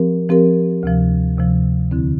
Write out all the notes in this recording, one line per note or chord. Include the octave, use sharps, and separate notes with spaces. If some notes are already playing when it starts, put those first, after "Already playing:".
Already playing: F3 C4 G4 A#4
F3 C4 G4 A#4
D2 C3 F3
D2 C3 F3
E2 D3 F3 C4 E4